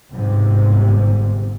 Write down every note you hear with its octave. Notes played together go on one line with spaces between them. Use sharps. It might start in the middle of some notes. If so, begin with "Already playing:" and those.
G1 G#2 C3